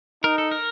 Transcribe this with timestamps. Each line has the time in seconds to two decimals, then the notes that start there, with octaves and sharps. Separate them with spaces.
0.23 D#4 A#4
0.38 A4
0.51 A#4